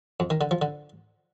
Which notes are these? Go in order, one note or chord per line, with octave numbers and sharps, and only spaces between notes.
F2
D#3
D3
F3
D3